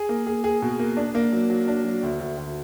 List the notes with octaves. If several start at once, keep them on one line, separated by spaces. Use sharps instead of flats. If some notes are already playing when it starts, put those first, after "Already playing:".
Already playing: G#4
A#3
G#4
G#4
B2
A#3
D4
A#3
F#3
F#3
D4
F#3
D2
D2
D2